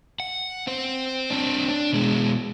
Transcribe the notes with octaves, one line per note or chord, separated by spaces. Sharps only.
F#5
C4 C5
C4 D4
D4
B2 G#3